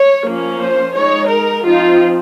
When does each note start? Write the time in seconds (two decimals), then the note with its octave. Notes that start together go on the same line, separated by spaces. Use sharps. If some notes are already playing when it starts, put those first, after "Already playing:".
Already playing: C#5
0.26 F3 A#3 C#4
0.60 C5
0.95 G#3 D#4 C#5
1.29 A#4
1.65 F3 C4 D#4 F4